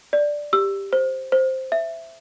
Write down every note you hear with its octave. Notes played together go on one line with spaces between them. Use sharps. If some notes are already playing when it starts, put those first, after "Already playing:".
D5
G4 E6
C5
C5
E5